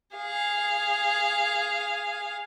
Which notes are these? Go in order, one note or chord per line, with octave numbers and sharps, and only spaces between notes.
G#4 F5